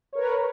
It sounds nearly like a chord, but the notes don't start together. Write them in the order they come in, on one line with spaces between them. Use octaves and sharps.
C#5 A#4 B4